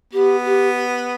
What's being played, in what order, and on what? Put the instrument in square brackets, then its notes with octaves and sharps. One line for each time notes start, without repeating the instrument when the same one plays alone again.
[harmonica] B3 [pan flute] G4
[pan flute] G4